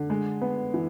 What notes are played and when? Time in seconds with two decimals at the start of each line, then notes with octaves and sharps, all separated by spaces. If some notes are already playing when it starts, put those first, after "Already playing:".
Already playing: D3
0.10 G#3
0.41 B3
0.74 E3